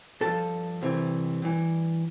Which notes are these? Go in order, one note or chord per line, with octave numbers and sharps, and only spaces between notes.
G2 F3 A4
C2 C3 E3
G2 E3